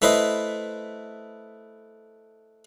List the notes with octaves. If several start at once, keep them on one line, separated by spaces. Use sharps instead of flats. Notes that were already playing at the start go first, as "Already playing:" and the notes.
A3 E4 B4 C5 D#5